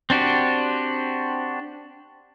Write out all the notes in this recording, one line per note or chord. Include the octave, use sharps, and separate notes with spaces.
C4 D4 F#4 G4